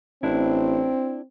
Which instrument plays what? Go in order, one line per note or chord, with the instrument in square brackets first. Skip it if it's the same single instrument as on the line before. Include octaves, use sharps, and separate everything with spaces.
[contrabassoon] A1 [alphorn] C4 [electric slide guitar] D4 E4